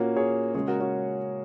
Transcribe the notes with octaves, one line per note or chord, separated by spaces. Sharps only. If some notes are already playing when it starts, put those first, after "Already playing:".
Already playing: A#2 A#3 C#4 F#4
G#4 C#5
C#3 G#3 G#4 C#5
F#4 A#4
C#4 F#4